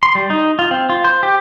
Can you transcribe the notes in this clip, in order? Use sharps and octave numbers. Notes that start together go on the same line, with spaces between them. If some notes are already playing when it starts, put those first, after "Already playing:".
C6
G3
D#4
F4
C4
F4
C5
G4